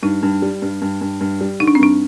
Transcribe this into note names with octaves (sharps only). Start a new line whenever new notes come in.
G2 D#4
G2
G3
G2
G2
G2
G2
G3
D3 D#4
D4
C4
G2 D4